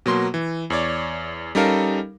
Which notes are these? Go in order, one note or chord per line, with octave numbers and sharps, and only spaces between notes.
B2 F#3 A#3 C6
E3
E2 C#5 D5
G3 C#4 D#4 A4 A#4 F5